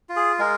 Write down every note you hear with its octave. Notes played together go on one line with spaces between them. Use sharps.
F4
G#4
G#3 A#4